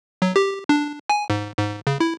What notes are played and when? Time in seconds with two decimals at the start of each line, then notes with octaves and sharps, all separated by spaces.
0.22 F#3
0.36 G4
0.69 D4
1.09 G#5
1.30 G#2
1.58 G#2
1.87 C#3
2.00 E4